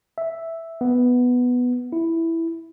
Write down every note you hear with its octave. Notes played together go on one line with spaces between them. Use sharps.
E5
B3
E4